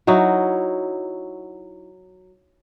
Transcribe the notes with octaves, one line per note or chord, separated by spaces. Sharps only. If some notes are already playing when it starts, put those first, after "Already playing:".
F#3 D#4 E4 F#4